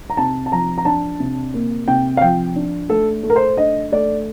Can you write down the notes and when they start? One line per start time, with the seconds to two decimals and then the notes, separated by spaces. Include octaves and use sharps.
0.10 A#5
0.17 C3 A5
0.46 A5
0.52 F3 A#5
0.78 A#5
0.85 D4 A5
1.20 C3
1.54 A#3
1.88 C3 G5
2.17 F5
2.21 F3 G5
2.56 D4
2.90 A3 A4
3.23 A3
3.30 A#4
3.36 C5
3.57 D4 D#5
3.92 A3 D5